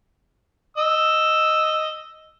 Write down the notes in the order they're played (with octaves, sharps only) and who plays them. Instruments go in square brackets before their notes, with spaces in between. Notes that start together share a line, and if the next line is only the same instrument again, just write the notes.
[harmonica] D#5 E6